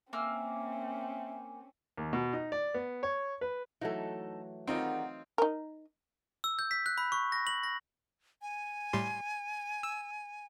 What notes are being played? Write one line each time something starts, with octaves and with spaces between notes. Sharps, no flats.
A#3 C4 C#4 E5 G#5 E6 F6
D#2
B2
D#4
D5
B3
C#5
B4
E3 F#3 A3 D#4 A4
D#3 G3 C4 D#4 F4 G#4 A#4 F#5
D#4 A#4
E6
G6
B6
F#6
B5
C#6
A#6
F#7
A#6
G#5
A2 G3 C6
E6